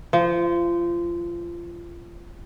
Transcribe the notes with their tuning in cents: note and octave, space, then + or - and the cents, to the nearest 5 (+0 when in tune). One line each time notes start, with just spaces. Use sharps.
F3 -25